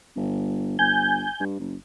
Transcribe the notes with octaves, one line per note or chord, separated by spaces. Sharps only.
G1
G1 G#5 G6
G2
F#1